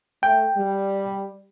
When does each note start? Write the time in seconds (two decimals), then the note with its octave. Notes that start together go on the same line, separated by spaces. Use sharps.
0.23 A3 G5
0.57 G3